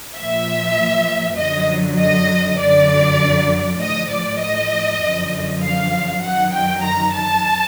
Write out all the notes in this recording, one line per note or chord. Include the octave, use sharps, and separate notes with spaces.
A#2 F3 E5
F#2 D3 F#3 D#5
D#5
F#2 D3 F#3 D5
A2 F3 D#5
D5
D#5
F#2 D3 F3
F5
F#2 D#3 F#3 F#5
G5
A#5
A5